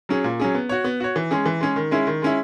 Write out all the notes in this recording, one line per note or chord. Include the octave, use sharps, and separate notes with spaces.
F#3 C#4 G#4
A#2
F#3 C#4 G#4
B3
F#4 C#5
B3
F#4 C#5
E3
G#3 C#4 G#4
E3
G#3 C#4 G#4
D#3
G#3 C#4 E4
D#3
G#3 C#4 E4